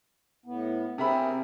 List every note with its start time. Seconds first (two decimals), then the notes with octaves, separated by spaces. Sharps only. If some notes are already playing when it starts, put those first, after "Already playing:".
0.46 A2 B3
0.98 C3 C4 G#4 A#4 E5 B5